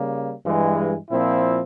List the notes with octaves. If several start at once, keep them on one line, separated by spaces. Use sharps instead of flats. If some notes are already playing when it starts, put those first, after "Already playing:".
Already playing: C#3 G3 A#3
G2 E3 G#3
A#2 F3 C4 E4